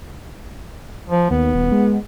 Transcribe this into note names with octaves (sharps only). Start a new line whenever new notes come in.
F3
D#2 B3
D#1
G#3